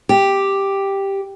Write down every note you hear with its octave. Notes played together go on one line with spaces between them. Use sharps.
G4